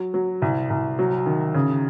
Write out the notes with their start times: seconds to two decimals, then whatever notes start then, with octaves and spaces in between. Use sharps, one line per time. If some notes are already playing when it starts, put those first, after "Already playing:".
Already playing: F#3
0.14 F#3
0.42 C2
0.70 C2
0.99 F#3
1.26 D#3
1.54 C#3